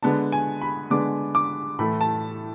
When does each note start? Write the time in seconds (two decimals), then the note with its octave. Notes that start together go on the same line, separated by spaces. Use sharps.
0.02 D3 G#3 B3 D4 A5
0.32 G#5
0.62 B5
0.90 D3 G#3 B3 D4 D6
1.35 D6
1.79 A2 E3 A3 B5
2.01 A5